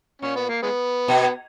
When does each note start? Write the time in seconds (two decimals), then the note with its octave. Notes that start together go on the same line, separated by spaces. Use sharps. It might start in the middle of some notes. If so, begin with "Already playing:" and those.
0.22 A#2 C#4
0.36 B3
0.49 A#3
0.63 G#3 B3
1.08 B2